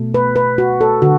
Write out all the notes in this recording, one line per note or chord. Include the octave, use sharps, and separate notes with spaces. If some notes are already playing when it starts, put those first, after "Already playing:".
Already playing: B2 A3
B4
B4
F#4
A4
D3 F#4